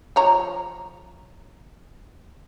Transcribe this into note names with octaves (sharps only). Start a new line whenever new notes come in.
F3 C#5 A#5